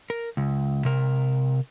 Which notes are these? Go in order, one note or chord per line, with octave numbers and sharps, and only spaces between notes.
A#4
C#2
C3 A#4